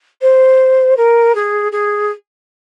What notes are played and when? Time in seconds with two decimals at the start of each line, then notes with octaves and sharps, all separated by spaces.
0.21 C5
0.97 A#4
1.35 G#4
1.72 G#4